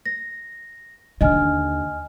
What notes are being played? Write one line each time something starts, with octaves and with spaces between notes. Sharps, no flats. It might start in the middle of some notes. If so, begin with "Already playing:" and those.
A#6
D#2 D3 D#5 G#5 F6